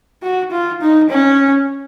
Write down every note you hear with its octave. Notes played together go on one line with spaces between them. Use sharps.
F#4
F4
D#4
C#4